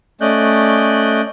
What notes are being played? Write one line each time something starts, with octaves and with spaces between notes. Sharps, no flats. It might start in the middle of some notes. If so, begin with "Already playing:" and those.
A3 C#4 D5 D#5 F#6 G6